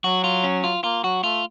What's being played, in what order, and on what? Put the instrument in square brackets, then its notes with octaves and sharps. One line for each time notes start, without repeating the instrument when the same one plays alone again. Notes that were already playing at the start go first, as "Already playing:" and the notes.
[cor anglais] F#3 [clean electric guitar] F#4
[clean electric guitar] F4
C#4
F4
[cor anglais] A#3 [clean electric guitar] F4
[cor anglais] F#3 [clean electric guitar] F#4
[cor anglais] A3 [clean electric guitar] F4